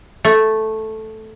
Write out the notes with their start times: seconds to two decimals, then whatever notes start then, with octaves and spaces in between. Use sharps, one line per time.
0.25 A3